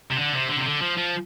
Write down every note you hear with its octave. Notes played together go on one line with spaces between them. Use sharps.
C3
D3
C3
D3
C3
D3
F3
F3